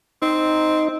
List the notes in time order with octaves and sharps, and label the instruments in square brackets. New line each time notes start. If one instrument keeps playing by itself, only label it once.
[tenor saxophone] C4 [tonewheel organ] D#4